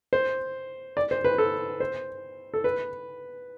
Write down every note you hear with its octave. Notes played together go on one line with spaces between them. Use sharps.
C5
D5
C5
B4
A4
C5
A4
B4